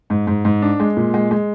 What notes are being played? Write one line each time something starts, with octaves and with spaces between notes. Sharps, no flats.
G#2
G#2
G#2
D4
G#3
A#2
G#3
G#3